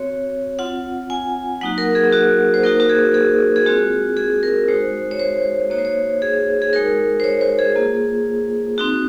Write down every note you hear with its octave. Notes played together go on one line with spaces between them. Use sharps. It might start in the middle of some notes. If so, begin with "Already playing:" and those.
Already playing: C4 F#4 C#5
C4 F4 F#5
G#5
F#3 A#3 D#4 F#4 F#5
A#4
G#4
F#4
C5
A#3 D#4 F#4 A#4
F#4
G#4
G#4
G#4
G#3 C4 F4 F#4
G#4
A#4
G#3 D#4 F#4 C5
C#5
C5
A#3 D#4 F#4 C#5
C5
C#5
G#4
G#4
G#3 D#4 F#4 A#4
C5
C#5
C5
G#4
A#3 F4
C4 D#4 F#4